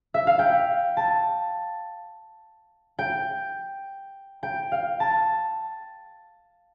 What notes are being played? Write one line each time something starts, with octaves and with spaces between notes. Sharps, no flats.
E5
F5
G5
A5
G5
G5
F5
A5